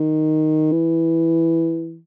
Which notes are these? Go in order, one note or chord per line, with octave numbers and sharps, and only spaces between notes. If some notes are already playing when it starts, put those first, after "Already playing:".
Already playing: D#3
E3